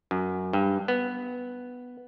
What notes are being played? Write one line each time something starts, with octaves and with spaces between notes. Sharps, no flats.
F#2
G2
B3